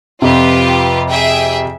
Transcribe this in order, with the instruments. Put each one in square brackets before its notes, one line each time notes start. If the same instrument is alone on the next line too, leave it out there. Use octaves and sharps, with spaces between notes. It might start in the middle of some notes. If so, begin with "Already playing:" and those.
[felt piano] F2 C3 [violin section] F4 G4 B4
[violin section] G#4 E5 G5